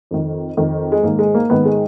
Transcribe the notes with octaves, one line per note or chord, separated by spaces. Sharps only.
F2 D#3
F2 D#3
G#3
G#2 D#3 A#3
G#3
A#3
G#2 D#3 B3
G#3